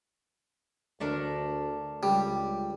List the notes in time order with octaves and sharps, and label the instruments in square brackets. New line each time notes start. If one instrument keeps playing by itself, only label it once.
[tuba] D2 [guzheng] A3 D4 A#4
[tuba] C#2 [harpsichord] G3